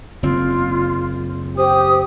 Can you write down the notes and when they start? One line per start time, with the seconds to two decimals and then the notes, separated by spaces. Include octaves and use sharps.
0.23 F#1 C4 F4
1.58 G4 C5 D#6